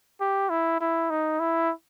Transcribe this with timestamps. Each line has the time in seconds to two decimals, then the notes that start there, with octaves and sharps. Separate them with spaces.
0.21 G4
0.50 E4
0.80 E4
1.10 D#4
1.40 E4